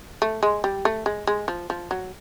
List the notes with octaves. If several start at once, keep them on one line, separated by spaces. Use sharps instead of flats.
A3
G#3
G3
A3
G#3
G#3
F3
F3
F#3